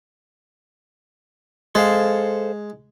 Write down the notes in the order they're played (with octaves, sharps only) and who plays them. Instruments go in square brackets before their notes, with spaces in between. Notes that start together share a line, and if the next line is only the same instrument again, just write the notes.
[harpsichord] G#3 [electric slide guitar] A4 C5 F5